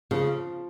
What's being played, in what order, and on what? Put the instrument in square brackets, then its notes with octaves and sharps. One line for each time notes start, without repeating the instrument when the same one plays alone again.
[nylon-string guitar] C#3 [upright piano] F3